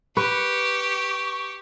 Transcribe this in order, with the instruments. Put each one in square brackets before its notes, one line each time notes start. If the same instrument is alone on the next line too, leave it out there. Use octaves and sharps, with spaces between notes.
[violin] G4 [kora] B4 [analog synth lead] C#6